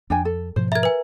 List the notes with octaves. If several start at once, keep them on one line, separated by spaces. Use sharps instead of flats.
F2 D4 G5 G#5
A4
G#2 B2 F3 C5
A#4 E5 A#5 G#6
B4 G#5